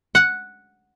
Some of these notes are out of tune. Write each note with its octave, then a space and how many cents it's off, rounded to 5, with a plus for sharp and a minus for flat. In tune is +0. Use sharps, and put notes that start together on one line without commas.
F#5 -5